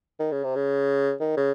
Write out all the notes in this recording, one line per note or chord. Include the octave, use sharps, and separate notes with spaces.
D#3
C#3
C3
C#3
D#3
C#3